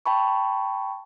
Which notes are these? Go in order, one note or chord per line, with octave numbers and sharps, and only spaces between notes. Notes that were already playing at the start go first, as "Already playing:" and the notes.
G5 A5 B5 C#6